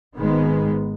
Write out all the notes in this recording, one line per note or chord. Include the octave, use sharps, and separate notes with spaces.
G#1 G#2 D#3 G#3 B3